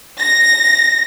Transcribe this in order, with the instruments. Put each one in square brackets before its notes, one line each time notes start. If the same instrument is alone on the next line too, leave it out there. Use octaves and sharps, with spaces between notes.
[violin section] A#6